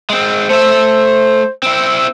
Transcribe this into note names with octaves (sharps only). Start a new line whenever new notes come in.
G#3 C4
A3 C5 E5
C4 E4